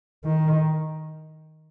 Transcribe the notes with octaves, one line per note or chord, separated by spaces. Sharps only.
D#3